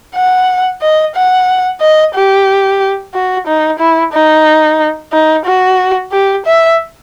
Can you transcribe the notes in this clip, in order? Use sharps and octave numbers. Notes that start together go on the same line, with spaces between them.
F#5
D#5
F#5
D#5
G4
F#4
D#4
E4
D#4
D#4
F#4
G4
E5